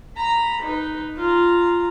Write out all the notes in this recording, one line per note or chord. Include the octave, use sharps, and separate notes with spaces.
A#5 B5
D#4 B4
F4 A#5